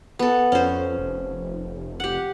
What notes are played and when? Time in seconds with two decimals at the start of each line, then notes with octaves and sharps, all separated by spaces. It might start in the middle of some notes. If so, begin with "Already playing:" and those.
0.19 B3 A4
0.52 F2 C#4 C5
0.98 F1
2.00 G4 F#5